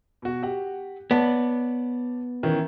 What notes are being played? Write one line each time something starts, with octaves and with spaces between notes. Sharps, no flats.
B2 F#4
G4 F#5
B3 C#5 D5 A5
D#3 E3 C#4